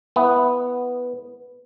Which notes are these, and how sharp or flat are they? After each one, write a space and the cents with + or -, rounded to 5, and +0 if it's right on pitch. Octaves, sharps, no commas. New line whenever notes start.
B3 +0 E4 +0